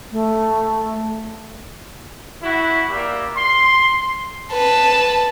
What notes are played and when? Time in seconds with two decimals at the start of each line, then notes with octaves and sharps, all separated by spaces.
0.12 A3
2.43 E4 F#4
2.90 A#3 G4 D5 E5
3.36 C6
4.52 B4 A5